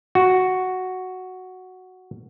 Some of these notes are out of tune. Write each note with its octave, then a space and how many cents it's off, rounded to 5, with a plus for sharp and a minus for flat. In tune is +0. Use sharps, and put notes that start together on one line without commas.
F#4 +0